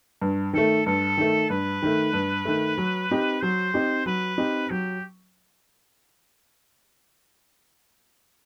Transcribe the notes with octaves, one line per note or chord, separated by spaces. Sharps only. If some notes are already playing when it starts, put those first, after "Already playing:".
G2
D#3 A3 A4
G2 A4
D#3 A3
G2 B4
D#3 A3
G2
D#3 A3
F#3
C4 D#4 G4
F#3 C5
C4 D#4 G4
F#3 B4
C4 D#4 G4
F#3 G4